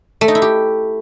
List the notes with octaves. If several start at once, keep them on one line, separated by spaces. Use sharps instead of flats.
A3
D#4
E4
G4